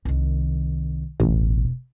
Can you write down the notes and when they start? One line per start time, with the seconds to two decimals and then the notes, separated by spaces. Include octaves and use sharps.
0.05 C2 D#3
1.20 E1 A1 B2